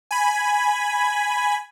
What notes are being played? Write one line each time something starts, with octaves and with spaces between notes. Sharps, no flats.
G#5 B5